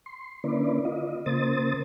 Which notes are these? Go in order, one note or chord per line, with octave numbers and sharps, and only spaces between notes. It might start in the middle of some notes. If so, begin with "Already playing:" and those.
C6
D3 A#3 C#4 E4 B4 D5
F4 D#5
C#3 A#3 C5 D#6 A6